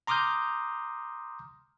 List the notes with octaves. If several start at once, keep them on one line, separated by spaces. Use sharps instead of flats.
A#5 C6 D6 D#6 F6 G6